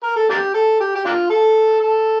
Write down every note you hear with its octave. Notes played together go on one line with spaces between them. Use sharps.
A#4
A4
A#3 D4 G4
A4
G4
G4
A#3 D4 F4
A4
A4